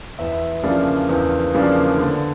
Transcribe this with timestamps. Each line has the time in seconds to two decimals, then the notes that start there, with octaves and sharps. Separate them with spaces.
0.19 E2 E5
0.63 C#3 F3 A#3 D4
1.09 E2
1.54 C#3 F3 A#3 D4
1.97 D3